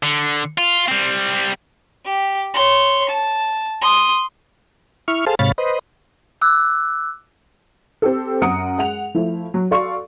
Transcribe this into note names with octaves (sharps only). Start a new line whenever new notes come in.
D3
F4
G3 C4
G4
C#5 C6
A5
C6 D#6
E4 C#6 F6
G#4 A4 C5 F5 A5
G#2 C3 C#5 F5 B5 A6
B4 C5 D#5
D6 E6 F#6
C4 G4 A4
F#2 F#5 A#5 D#6 C#7 D7
G#3 F#5 F7
F3 A3 E4
F#3
F#4 A4 D5 F5 C6 C#6